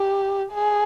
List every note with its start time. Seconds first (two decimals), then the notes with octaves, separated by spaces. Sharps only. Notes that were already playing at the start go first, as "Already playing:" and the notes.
Already playing: G4
0.53 G#4